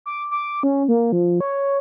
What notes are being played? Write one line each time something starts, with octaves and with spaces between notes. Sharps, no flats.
D6
D6
C#4
A#3
F3
C#5